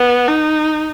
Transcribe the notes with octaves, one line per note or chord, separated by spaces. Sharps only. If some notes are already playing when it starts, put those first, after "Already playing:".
Already playing: B3
D#4